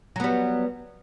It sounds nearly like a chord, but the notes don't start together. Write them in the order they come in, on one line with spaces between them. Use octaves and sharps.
F#3 B3 G3